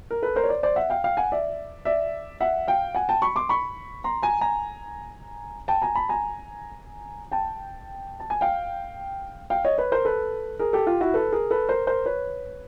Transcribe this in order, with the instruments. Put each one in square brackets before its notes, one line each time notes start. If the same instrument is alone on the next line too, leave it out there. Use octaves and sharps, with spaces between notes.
[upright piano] A#4
A4 B4
A#4 C5
C#5
C5 D5
C5 D5
E5 F#5
F5 G5
F5 G5
F#5 G#5
D5 E5
D5 E5
E5 F#5
F5 G5
F#5 G#5
G5 A5
B5 C#6
C6 D6
B5 C#6
A#5 C6
G#5 A#5
G#5 A#5
G5 A5
G#5 A#5
A5 B5
G#5 A#5
G5 A5
A5
G#5
F5 G5
F5 G5
C#5 D#5
B4 C#5
A#4 C5
A4 B4
G#4 A#4
G4 A4
F4 G4
E4 F#4
A4 B4
G#4 A#4
A4 B4
A#4 C5
A#4 C5
B4 C#5